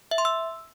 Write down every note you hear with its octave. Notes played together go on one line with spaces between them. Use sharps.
E5
C6
E6